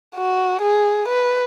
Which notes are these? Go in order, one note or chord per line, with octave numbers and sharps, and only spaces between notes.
F#4
G#4
B4